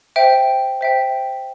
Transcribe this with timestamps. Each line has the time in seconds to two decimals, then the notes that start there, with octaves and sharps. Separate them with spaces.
0.16 C5 E5 G5
0.81 C5 E5 G5